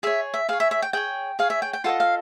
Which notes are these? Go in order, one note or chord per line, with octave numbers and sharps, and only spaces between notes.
G#4 C#5 E5
E5
G#4 C#5 F5
E5
E5
G5
G#4 C#5 G5
G#4 C#5 F5
E5
G5
G5
F4 A4 C5 D#5 F#5
F5